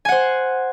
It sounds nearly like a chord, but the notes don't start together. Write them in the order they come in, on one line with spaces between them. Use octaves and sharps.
G#5 F#5 C5